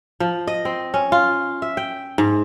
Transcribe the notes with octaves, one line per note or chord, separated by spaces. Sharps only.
F3
D#5
C4
C#4
F4
E5
G5
G#2